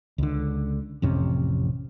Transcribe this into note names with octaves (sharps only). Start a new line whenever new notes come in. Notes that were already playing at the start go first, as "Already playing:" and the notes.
C#2 D3
A1 F2 C3 C#4